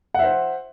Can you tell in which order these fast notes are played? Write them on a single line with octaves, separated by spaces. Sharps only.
F#5 E5 C5